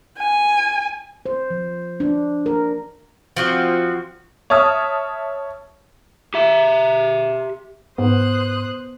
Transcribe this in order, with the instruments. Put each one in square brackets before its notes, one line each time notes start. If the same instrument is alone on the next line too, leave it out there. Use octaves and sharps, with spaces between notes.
[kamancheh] G#5
[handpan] C5
F3
D4
A#4
[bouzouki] F3 C4 F#4
[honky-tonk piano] C#5 E5 A5 D#6 F6
[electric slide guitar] G4 E5
[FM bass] G#2 [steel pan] B3 [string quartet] C5 D#6 F#6